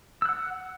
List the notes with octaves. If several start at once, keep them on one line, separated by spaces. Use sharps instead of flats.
F#5 E6 F#6